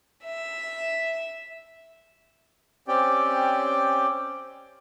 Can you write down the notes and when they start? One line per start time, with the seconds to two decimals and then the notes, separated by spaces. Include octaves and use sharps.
0.24 E5
2.88 C4 C#4 G4 D5 G5